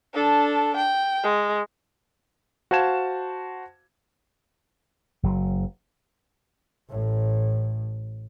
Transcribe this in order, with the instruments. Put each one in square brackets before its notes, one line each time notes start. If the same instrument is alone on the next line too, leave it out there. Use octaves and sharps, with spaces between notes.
[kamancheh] D4 A4
G5
G#3
[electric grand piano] F#4 C5 F5 A5 G#6 E7
[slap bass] F#1 F#3
[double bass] A1 A2